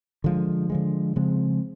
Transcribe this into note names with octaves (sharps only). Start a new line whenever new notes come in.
D3 F3 G#3
D3 F3 G#3
C#3 F3 G#3 C4